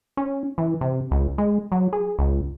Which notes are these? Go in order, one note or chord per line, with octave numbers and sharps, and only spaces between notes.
C#4
E3
C3
C#2
G#3
F#3
G#4
C#2